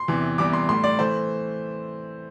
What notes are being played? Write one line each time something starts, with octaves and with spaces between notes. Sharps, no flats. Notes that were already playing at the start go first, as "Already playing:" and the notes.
Already playing: C6
E2 C3 E3
E2 C3 E3 G3 D6
C6
A2 G3 C6
D5
E3 A3 C5